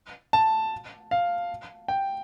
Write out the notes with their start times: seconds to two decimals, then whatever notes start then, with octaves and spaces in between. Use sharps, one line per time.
0.33 A5
1.11 F5
1.88 G5